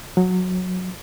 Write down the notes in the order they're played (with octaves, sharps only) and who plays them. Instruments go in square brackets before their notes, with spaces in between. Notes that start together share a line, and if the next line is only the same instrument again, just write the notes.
[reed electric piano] F#3